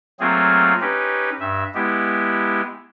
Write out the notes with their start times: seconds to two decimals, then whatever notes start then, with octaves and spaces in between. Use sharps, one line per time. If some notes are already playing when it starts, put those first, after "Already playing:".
0.20 F#3 A3 A#3 C4 F4 G#4
0.81 C#4 D#4 G4 B4
1.40 G2 E5
1.75 G#3 B3 E4 G4